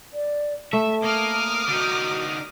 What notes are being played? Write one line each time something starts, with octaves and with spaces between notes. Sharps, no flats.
D5
A3 E5 A5
A#3 D6 D#6 F6
D3 D#4 F#4